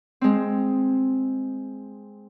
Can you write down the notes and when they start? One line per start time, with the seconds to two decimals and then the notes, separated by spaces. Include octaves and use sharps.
0.21 G#3 C4